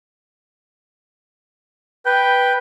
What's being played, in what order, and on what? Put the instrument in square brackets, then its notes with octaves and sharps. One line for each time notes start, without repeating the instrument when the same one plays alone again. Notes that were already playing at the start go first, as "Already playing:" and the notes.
[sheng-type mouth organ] B4 [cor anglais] G5